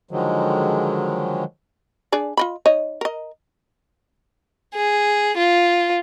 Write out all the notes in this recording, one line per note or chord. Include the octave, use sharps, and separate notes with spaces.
D3 D#3 F3 F#3 G#3
D4 G#4 D5
F4 D#5 B5
D#4 C#5 D#5
A#4 D#5
G#4
F4